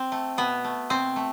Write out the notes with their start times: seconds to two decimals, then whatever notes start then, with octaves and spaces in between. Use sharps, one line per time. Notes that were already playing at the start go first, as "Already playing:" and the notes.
Already playing: C4
0.12 A3
0.37 B2 B3
0.64 A3
0.90 B2 C4
1.16 A3